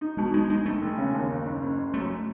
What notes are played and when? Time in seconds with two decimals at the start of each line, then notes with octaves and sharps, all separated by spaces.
0.01 D#4
0.17 B2 G#3
0.34 G#3 D#4
0.50 G#3 D#4
0.65 E1 A3
0.82 E1
0.98 C#3
1.14 D#2
1.30 F#1
1.46 F#1
1.62 F#1
1.78 F#1
1.94 F#2 A3